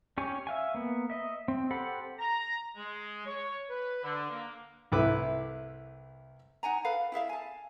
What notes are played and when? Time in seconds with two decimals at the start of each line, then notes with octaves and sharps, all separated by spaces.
0.18 C#4 G4 C#5 G#5
0.47 E5 F5 G#5
0.74 A#3 B3
1.10 D#5 E5
1.48 C4
1.71 G4 A4 C5 F#5 B5
2.19 A#5
2.77 G#3
3.26 C#5
3.69 B4
4.03 D3
4.30 A#3
4.92 C2 C3 A3 E4 B4 D6
6.63 D#4 F#5 G#5 A#5
6.84 A4 B4 F5 B5
7.12 E4 G#4 E5 F5
7.29 G#5 A5